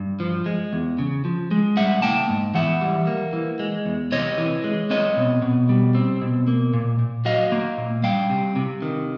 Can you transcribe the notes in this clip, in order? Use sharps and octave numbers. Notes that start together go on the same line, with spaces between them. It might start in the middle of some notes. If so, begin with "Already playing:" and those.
Already playing: G2
F3
G#3
E2
C#3
F3
G#3
G3 E5 F#5
A#3 G5 A5
G#2
E3 E5 F#5
G3
A#3
E3
G#3
E2
C3 C#5 D#5
E3
G#3
C4 C#5 D#5
B2
B2
G3
C4
B2
A#3
A#2
A#2
F#3 D#5 F5
A#3
A#2
G3 F5 G5
C3
C3
D#3